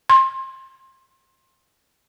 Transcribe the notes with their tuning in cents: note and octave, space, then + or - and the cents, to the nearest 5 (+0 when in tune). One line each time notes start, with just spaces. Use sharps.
C6 +25